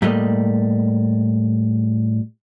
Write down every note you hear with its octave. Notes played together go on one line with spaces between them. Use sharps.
A2 G3 G#3 A#3 D#5